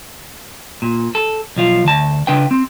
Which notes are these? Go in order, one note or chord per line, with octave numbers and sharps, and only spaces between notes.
A#2
A4
B1 F3 F4
D2 A5
C#3 D4 B4 G5
C4